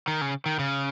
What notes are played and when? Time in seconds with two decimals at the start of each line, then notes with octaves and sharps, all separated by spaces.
0.08 D#3
0.21 C#3
0.46 D#3
0.59 C#3